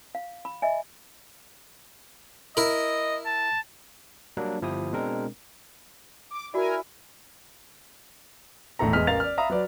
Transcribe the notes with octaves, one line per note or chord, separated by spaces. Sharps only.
F5
B5
D#5 E5 G#5
E4 A#4 D#5
A5
F#3 G3 A#3 D4
G1 F3 E4 G4 D#6
B2 G#3 C4 D4 A#4
D6
E4 F#4 A#4 D5 G#5
E1 A2 E4 A4 A#5
E2 G#3 D#5 G#5 F6 B6
A1 A#4 F5 A#5 A6 F7
D5 F6
E5 F5 A#5 B5 D#6
F#3 B4 D5